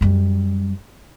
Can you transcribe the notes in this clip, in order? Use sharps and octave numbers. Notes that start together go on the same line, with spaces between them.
F#2 G3